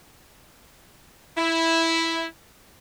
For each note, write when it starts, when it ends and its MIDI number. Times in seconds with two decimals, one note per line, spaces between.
1.37 2.25 64